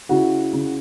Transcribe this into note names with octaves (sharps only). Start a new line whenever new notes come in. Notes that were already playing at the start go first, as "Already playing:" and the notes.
C#3 E4 F#4
C#3